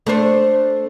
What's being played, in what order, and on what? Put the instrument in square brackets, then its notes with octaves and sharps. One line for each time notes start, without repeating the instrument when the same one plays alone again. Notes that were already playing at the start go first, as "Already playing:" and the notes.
[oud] A3 D4 C5